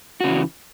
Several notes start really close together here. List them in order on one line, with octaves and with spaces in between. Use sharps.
F#4 C#3 E3